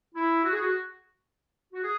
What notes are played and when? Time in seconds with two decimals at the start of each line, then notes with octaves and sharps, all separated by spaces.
0.15 E4
0.43 F#4
0.52 G#4
0.60 F#4
1.72 F#4
1.82 G#4